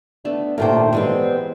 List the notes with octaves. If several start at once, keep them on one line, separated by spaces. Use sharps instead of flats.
A3 B3 D4 A4
D#2 A#2 A3 A#4 C5 G5
E3 G3 G#3 B3 C4